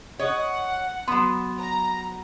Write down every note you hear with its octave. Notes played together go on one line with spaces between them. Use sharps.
C#5 D#5 F#5
F#3 B3 C6
A#5